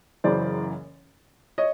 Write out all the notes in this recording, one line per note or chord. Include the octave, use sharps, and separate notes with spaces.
F#1 F#2 C#3 E3 C5 D5
C#5 D#5